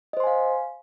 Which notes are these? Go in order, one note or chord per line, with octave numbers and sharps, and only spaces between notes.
C5 D#5 F5 G#5 C6